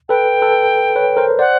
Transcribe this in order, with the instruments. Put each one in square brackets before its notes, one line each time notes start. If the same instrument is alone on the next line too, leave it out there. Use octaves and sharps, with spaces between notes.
[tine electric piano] A4 B4 [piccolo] G5
[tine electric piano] A4 B4
B4 C#5
A#4 C5
[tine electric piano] C5 D5 [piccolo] F#5